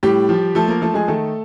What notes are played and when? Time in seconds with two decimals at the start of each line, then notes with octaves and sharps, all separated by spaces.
0.03 A2 G3 G4
0.29 F3
0.55 F3 A3 A4
0.68 A#3 A#4
0.81 F3 A3 A4
0.94 G#3 G#4
1.08 D#3 A3 A4